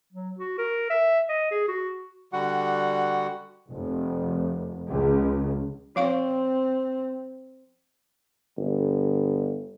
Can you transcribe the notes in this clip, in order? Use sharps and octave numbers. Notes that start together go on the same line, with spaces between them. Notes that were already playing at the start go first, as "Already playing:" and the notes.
F#3
F#4
A#4
E5
D#5
G#4
F#4
D3 G3 F#4 F#5
F1
C#2
F3 C4 F5 C#6
G1